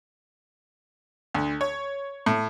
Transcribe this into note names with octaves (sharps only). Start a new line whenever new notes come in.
D2
C#5
A2